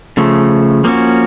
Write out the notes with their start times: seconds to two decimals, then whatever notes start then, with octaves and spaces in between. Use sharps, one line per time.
0.17 C#3 F3 A3
0.84 F3 A#3 C#4 F#4